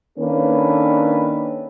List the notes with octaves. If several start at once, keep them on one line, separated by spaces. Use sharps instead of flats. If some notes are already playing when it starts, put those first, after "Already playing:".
D#3 A#3 C#4 D4 A4 B4